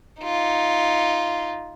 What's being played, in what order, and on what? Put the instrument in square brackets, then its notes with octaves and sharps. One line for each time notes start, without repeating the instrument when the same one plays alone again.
[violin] D#4 F4